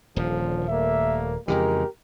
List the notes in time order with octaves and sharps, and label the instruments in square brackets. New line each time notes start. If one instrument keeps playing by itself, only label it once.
[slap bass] D#1 [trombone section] A#2 D3 F3
[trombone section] G3 A3 A#3 [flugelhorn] E5
[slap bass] F2 C#3 E3 [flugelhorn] G#3 [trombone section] G4 A#4